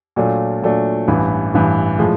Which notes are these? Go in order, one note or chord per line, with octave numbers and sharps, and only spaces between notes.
A#2 F#3 A3 D4 F4
A#2 F#3 A3 D4 F4
A1 G2 E3
A1 G2 E3
A2 F3 G#3